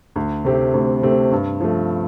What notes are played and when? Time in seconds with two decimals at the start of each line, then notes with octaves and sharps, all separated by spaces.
0.16 D2
0.45 C3 A3 C4 G4
0.74 D2
1.02 C3 A3 C4 G4
1.32 G2
1.60 F3 A3